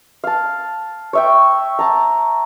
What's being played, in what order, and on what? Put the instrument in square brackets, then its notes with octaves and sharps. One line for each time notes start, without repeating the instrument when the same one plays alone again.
[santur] F5 A5
C#5 E5 G5
A5 A#5